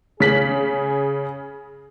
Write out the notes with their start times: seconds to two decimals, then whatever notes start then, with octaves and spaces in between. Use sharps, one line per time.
0.20 C#3 G#4 B6 F#7